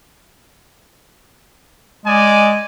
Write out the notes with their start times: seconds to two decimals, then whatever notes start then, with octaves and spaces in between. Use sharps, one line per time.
2.05 G#3 D5 D#5 G#5